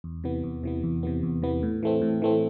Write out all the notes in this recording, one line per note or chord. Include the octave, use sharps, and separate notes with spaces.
E2
C3 E3 B3
E2
C3 E3 B3
E2
C3 E3 B3
E2
C3 E3 B3
A2
E3 A3 C4
A2
E3 A3 C4